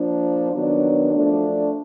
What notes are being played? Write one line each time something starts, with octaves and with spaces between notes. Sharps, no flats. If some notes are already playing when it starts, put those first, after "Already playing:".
Already playing: F3 A#3 D4
D#3 F#3 B3 D4
F3 A3 D4